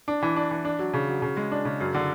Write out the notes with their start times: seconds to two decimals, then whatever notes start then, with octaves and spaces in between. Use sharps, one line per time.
0.08 D4
0.22 E3
0.36 D4
0.51 E3
0.65 D4
0.79 F#3
0.93 C#3
1.08 F#3
1.22 C#3
1.37 G#3
1.51 D4
1.65 C#3
1.81 F#2
1.94 D3